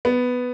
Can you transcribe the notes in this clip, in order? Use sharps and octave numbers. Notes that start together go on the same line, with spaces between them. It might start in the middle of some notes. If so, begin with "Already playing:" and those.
B3